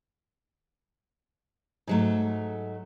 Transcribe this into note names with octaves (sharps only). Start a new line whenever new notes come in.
G#2 F#3 A3